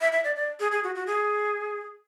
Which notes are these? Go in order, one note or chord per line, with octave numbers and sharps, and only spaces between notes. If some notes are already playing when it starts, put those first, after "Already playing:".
E5
E5
D5
D5
G#4
G#4
F#4
F#4
G#4